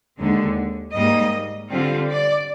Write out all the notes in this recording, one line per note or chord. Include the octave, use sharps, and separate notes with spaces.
D#2 D3 G#3
G#2 G3 A#3 D#5
D3 G3 C4 F4
D5